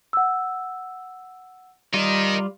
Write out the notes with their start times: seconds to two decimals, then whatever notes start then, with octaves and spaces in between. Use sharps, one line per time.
0.13 F#5 E6
1.94 G3 F4 A#4 D#5